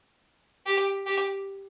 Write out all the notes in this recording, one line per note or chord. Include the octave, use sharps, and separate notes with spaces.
G4
G4